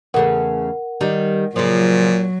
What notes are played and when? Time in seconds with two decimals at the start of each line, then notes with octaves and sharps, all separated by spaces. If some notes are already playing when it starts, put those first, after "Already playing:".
0.14 E2 C#3 A3 A#4 F#5
1.01 D#3 G3
1.56 A#2 C#3 F3 F#3